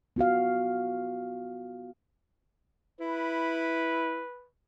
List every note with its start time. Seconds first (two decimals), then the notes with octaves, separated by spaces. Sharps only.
0.16 B3 F4 F#4 F5
3.00 E4 B4